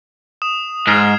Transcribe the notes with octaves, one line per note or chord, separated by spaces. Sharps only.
D#6 E7
G#2 F6 G#6 C7